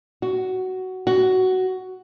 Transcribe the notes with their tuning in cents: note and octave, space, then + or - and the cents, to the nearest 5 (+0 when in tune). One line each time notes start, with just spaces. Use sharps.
F#4 +10
F#4 +10